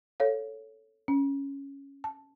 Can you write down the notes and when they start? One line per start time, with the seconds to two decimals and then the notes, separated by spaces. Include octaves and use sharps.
0.20 A4 C#5 F5
1.08 C#4
2.04 A5